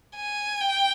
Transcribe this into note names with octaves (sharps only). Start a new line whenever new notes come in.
G#5
G5